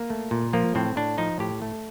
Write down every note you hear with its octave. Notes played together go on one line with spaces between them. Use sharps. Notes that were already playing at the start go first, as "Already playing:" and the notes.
Already playing: A#3
A3
A#2
F3 A#3
A2 C4
A2 D4
F3 D#4
A2 G4
A3